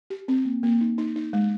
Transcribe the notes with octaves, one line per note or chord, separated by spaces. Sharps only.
G4
C4
A#3
A#3
D#4
D#4
D#4
G#3